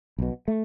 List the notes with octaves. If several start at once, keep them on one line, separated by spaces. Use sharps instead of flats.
B1 B2
A3